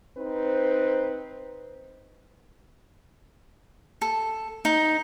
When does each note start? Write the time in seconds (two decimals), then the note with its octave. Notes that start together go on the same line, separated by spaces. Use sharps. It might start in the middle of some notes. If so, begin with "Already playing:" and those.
0.18 C4 D#4 B4 C5
4.02 A4
4.65 D#4